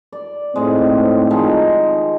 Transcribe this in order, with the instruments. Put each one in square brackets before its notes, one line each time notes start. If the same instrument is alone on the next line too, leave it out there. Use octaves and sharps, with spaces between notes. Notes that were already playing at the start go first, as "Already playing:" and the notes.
[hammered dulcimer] D5
[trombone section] A2 C4 D#4 [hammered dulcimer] G#3
[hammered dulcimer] D#3 F3 G#3